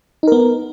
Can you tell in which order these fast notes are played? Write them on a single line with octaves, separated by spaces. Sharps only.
D#4 A#4 B3